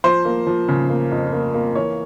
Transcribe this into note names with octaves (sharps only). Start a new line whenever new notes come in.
F3 C5
A#3
F3
C#3
A#3
F2
A#3
A#3
E3 C#5